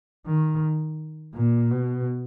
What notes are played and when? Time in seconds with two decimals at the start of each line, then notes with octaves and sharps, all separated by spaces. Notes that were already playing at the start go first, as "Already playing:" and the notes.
0.26 D#3
1.35 A#2
1.71 B2